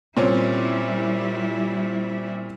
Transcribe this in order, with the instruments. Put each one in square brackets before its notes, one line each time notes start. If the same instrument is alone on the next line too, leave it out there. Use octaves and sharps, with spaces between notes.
[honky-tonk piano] A#2 C4 C#4 [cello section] G3 E4